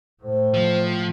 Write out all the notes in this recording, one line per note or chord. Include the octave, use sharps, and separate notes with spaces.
A2 C5
F3